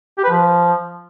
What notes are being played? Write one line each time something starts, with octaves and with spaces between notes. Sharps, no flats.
G4
B4
F3